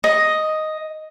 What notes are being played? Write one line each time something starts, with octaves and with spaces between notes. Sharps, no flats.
D#5